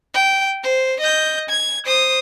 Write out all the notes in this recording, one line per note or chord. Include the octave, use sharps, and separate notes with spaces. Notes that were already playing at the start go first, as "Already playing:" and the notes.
G5
C5
D#5 G6
G#6
C5 D#6